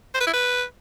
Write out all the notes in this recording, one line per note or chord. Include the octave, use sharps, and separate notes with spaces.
C5
B4
E4
B4